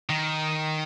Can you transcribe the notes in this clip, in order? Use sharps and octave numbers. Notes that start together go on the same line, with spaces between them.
D#3